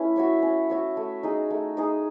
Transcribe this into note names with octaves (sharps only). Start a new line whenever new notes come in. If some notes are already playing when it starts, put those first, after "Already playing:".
Already playing: A3 C#4 E4 B4
F#4 C#5 E5
C#4
F#4 C#5 E5
A3
D#4 G#4 D#5
A3
D#4 G#4 D#5